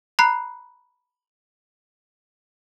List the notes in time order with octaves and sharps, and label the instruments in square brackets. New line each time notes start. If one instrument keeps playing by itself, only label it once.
[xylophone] A#5 B5 F#6 C7